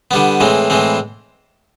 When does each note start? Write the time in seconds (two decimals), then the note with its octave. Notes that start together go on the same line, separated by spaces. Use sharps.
0.11 D3 G3 B3
0.40 A2 E3 G#3 C4
0.70 A2 E3 G#3 C4